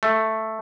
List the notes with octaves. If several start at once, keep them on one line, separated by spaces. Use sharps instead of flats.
A3